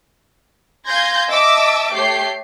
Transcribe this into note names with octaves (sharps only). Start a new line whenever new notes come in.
F5 G#5 C6 G6 G#6 A#6
D#5 E5 A5 D6 E6
A3 G4 C#5 G6 C7